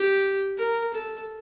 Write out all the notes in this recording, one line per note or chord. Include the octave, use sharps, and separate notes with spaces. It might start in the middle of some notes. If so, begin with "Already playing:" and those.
Already playing: G4
A#4
A4